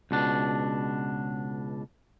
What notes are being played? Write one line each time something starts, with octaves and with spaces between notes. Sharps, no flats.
C#2 B2 D4